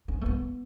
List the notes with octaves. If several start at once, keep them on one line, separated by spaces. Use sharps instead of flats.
C#4
A3
B3